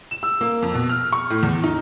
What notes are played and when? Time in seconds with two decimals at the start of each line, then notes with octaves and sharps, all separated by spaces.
0.11 E7
0.23 E6
0.41 A#3
0.62 F2
0.74 B2
0.90 F6
1.13 C#6
1.30 A2
1.43 E2
1.64 D#4